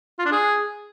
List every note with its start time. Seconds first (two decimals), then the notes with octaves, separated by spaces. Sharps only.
0.19 F4
0.25 D4
0.32 G#4